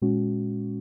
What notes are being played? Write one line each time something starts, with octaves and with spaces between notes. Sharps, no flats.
A#2 G#3 C#4 F#4